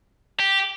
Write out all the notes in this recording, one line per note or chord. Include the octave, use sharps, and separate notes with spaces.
G4